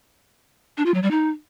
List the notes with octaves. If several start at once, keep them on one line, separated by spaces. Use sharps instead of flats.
D4
F4
F#3
G3
D#4